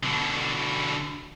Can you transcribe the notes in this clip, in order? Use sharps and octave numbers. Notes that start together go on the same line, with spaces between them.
B2 D3